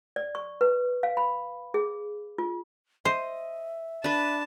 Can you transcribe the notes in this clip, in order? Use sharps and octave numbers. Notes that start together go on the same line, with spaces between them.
D5
C#6
B4
F5
B5
G#4
F4
C5 D#5 E5
D4 B4 A5